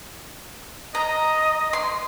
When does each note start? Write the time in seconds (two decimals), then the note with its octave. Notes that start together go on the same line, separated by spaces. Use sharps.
0.95 D#5 A#5
1.73 C6